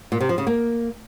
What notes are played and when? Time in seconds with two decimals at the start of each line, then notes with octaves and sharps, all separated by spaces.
0.12 A#2
0.21 C3
0.29 F3
0.38 C#3
0.47 A#3